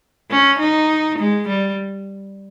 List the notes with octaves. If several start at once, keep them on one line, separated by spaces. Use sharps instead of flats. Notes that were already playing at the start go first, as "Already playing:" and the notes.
C#4
D#4
G#3
G3